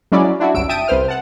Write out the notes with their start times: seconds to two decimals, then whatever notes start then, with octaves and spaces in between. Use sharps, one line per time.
0.12 F#3 G#3 C#4 E4 D5
0.40 D4 E4 F#4
0.54 G1 C2 F#2 E6 D7
0.69 E5 G5 A5 D#6 D7 D#7
0.88 C2 B4 C5 F6
1.08 F#5 A5